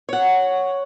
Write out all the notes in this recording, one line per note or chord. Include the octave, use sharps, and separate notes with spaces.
C#5 F#5